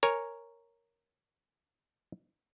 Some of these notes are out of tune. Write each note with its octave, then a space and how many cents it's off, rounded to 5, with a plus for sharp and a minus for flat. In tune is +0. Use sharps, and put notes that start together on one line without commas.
A#4 +0 C#5 +0 G#5 +0